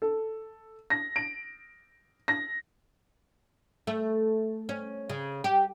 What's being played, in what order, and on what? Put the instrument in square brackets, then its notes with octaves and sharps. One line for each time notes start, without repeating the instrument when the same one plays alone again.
[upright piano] A4
A#6
D7
A#6
[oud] A3
C#4
C#3
G4